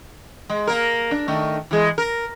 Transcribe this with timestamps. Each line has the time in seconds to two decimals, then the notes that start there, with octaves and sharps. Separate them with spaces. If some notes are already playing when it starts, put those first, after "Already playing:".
0.50 G#3
0.67 A#3 A#4
1.11 D4
1.28 D#3 A3
1.71 E3 G#3
1.98 A#4